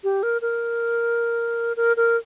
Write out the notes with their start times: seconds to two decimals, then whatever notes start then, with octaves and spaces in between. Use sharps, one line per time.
0.04 G4
0.23 A#4
0.42 A#4
1.77 A#4
1.97 A#4